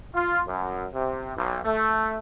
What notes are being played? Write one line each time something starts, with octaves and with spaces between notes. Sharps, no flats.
F4
F#2
C3
B1
A3